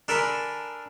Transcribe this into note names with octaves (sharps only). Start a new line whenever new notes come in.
D4 A4 A#4 G#5 B5 C6